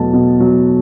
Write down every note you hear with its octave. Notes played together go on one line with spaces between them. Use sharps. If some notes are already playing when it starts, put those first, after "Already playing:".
Already playing: E2 B2 F#3 A3 A5
B2
F#3